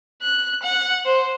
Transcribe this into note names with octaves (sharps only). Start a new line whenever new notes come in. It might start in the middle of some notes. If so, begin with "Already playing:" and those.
F#6
F#5
C5